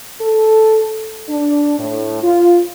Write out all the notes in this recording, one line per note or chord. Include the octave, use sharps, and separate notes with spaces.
A4
D4
A2
F4